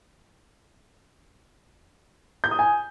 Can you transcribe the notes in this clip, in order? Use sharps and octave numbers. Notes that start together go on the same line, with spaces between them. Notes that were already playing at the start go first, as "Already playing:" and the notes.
G6
D#6
G#5